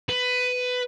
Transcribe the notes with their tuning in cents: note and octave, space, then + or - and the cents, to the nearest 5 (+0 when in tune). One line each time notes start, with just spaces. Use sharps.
B4 +15